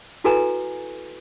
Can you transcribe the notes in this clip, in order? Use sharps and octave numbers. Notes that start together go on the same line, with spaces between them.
E4 F#4 A4 B4 G#5 A#5